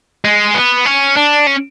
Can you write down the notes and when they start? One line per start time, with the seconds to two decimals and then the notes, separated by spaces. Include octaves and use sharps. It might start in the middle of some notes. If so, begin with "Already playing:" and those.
0.25 G#3
0.55 B3
0.86 C#4
1.17 D4
1.47 C#4